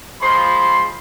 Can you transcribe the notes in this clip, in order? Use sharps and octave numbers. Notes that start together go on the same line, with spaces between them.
F3 G#3 G#4 C5 B5 C6